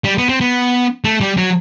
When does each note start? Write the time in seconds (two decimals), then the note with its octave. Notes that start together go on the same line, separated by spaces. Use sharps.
0.04 G3
0.18 B3
0.29 C4
0.41 B3
1.04 A3
1.21 G3
1.37 F#3